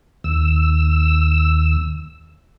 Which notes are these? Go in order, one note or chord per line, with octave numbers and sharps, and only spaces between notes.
D#2 E6